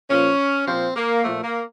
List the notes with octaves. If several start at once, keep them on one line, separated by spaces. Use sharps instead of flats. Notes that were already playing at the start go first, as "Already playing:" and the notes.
A#2 F3 C#4
A#2 F3 C4
A#3
A#2 F3 A3
A#3